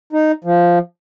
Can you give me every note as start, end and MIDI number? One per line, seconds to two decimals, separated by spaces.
0.13 0.32 63
0.44 0.79 53